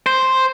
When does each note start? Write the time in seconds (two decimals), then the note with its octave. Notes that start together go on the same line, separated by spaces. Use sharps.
0.06 C5